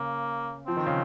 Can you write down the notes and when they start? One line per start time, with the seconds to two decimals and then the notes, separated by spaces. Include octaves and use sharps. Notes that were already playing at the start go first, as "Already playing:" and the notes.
Already playing: C#3 A#3
0.67 F3 C4
0.77 D#3
0.86 C#3